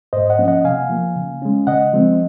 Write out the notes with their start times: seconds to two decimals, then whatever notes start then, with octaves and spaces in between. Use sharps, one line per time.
0.13 G#2 C5 D#5
0.30 D#5 F#5
0.39 F3 A#3 C#4
0.48 D#5 F#5
0.64 C3 F5 G#5
0.90 F3 A#3
1.16 C#3
1.42 G#3 C#4
1.67 C#3 D#5 F#5
1.93 F3 G#3 C4